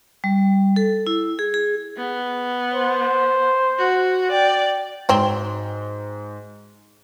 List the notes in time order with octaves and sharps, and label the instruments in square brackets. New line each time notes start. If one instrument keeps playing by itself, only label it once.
[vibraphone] G3
A4
E4
G#4
G#4
[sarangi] B3
[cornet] C5
[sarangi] F#4
[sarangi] D5 [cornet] G5
[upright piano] G#2 G7 [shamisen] F#3 C4